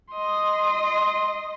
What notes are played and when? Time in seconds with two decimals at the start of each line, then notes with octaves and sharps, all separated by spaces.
0.13 D#5 C6